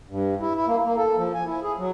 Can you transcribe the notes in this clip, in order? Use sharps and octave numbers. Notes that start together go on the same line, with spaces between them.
G2
E4
E4
A#3
A#3
A4
F3
G#5
E4
G#4
F#3